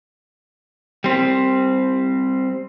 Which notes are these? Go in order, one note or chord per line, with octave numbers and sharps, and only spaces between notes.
G3 C4